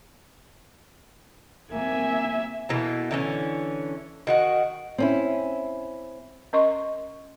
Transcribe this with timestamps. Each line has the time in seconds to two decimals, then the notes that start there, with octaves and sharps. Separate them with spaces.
1.73 A#3 C4 E5 G#5
2.69 B2 E3 A3 A#3
3.11 D3 E3 C#4
4.27 D#3 F#4 F#5
4.98 C4 C#4 E4
6.53 C#4 A#4 D#5 C6 C#6